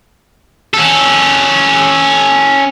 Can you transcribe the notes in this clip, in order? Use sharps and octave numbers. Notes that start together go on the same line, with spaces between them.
C#4 A4